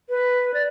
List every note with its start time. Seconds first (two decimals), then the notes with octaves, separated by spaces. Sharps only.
0.09 B4
0.54 D5